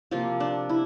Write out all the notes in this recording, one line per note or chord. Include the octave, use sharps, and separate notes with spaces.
C3 F3 A#3 F4
D4
E4